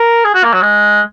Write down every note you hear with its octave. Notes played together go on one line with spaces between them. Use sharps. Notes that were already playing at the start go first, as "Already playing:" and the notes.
Already playing: A#4
G#4
F#4
A#3
F#3
G#3